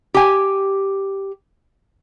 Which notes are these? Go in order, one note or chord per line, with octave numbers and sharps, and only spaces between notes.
G4 G#5